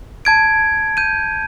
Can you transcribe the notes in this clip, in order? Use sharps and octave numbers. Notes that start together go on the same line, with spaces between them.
A5 G#6 D7
G6 D#7